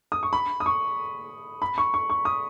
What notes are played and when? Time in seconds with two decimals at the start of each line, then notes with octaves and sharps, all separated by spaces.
0.12 D#6
0.23 C#6
0.33 B5
0.60 D#6
0.66 C#6
1.62 B5
1.78 C#6
1.94 C#6
2.10 C#6
2.25 D#6